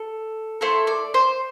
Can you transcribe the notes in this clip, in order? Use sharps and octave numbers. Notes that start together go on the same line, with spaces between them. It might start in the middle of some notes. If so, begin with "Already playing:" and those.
Already playing: A4
A3 E4 A4 C5
D5
C5